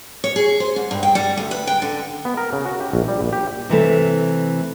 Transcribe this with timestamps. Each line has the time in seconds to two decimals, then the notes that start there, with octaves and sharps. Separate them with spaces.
0.24 C#5
0.36 G#4
0.60 C5
0.76 G#2
0.91 G2
1.03 G5
1.15 G3
1.37 D2
1.51 B4
1.67 G5
1.82 D3
2.25 B3
2.37 A#4
2.53 C#3
2.65 F#4
2.80 G4
2.93 A#1
3.08 G3
3.21 A#1
3.33 G4
3.69 C3 E3 A3